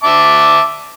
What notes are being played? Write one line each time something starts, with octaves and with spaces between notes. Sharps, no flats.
E5 A5 D6